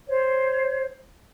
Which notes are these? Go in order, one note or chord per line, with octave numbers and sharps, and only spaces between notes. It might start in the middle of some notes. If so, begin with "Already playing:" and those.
C5 C#5